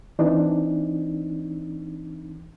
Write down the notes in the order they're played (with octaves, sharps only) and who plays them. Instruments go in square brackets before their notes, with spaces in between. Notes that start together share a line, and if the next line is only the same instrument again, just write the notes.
[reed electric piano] E3 C4 D4 D#4